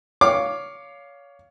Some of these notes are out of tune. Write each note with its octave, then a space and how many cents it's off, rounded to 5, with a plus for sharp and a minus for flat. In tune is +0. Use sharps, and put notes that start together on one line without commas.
C#5 +25 F5 +0 D6 +10